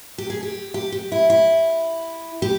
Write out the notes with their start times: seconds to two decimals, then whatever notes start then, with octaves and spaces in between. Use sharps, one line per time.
0.18 G4
0.30 G#4
0.43 G4
0.74 G4
0.92 G4
1.12 E4
1.30 E4
2.42 G4